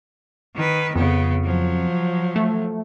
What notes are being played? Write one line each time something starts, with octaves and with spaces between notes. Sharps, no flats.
D#3 B4
F2 C#3 B3
F3 F#3
A3